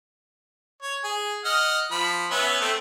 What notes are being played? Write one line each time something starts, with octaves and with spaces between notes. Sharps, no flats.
C#5
G#4
D#5 F#5 F6
F3 B5
B3 C#4 E5
A3 C4